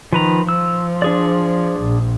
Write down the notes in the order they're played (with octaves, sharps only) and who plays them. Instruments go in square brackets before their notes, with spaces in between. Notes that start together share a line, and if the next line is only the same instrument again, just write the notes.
[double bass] D#3 [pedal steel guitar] F3 B4 A#5
[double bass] F3 [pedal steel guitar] E6
[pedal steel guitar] D4 G#4 D5
[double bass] A#1